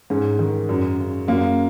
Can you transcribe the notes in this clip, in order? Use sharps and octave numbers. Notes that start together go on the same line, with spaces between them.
G#2 C#4
D#3
F#2
C#3
F#2 A#3